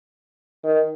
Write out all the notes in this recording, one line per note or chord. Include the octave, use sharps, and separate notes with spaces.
D#3